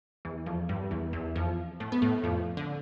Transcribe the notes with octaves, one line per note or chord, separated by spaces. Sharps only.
E2 E3
F2 F3
G2 G3
E2 E3
E2 E3
F2 F3
A2 A3
B3
A2 A3
F2 F3
D3